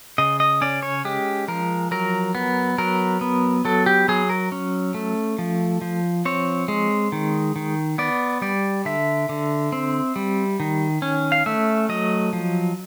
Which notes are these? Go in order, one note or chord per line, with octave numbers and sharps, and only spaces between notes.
C#3 D#5
D#5
C#4 D5
C#5
G#3 G4
F3 A#4
F#3 A#4
B3
F#3 A#4
B3
F#3 A4
G4
F#3 G#4
A#4
C#4
A3
F3
F3
C4 C#5
G#3
D#3
D#3
B3 D5
G3 D5
D3 E5
D3
C4
G3
D#3
C#4
F5
A3 E5
F#3 D#5
F3